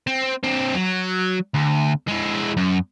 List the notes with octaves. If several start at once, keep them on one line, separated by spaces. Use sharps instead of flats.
C4
C4 D4
F#3
D2
G#3 E4
F#2